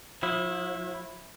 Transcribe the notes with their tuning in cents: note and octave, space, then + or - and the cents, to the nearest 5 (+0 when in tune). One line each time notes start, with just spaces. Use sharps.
F3 +40 E4 +0